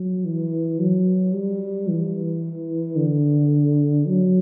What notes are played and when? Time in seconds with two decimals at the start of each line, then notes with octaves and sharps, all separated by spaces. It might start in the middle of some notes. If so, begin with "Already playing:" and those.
Already playing: F#3
0.25 E3
0.79 F#3
1.34 G3
1.88 E3
2.97 D3
4.06 F#3